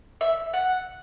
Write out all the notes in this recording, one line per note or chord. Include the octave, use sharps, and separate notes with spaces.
E5
F#5